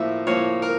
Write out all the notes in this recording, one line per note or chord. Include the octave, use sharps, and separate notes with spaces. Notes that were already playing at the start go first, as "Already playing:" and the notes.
Already playing: A2 F3 A#3 E5
A2 F3 A#3 C#5
A#4